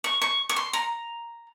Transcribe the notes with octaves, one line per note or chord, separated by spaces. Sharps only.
C#6
C#6
C#6
C6
A#5